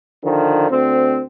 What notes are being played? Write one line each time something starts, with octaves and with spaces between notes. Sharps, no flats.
D3 D#3 F3
D2 C4